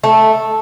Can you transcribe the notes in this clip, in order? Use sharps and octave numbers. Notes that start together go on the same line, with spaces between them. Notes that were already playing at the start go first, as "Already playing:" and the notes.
A3